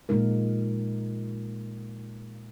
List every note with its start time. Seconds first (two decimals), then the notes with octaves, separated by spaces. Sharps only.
0.09 A#2 G#3 D#4 A#4